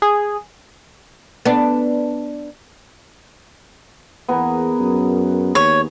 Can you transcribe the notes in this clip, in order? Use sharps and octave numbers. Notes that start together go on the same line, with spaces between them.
G#4
B3 D4
E2 B3 G#4 A#4
F#2
D#2 C#5